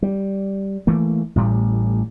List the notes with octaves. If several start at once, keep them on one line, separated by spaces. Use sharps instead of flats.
G3
E3 A3 A#3
A1 A2 G3